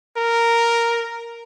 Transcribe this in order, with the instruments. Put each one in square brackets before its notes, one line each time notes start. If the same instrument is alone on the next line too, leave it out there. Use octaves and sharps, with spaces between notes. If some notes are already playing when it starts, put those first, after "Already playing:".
[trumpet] A#4